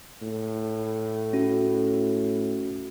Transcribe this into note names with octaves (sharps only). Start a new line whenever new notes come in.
A2
C#4 F#4